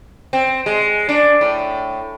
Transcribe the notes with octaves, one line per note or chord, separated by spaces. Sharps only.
C4
G#3
D4
A2